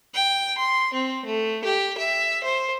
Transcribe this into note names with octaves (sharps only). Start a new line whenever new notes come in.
G5
C6
C4
A3
G4
E5
C5